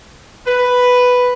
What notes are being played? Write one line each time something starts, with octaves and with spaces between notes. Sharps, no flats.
B4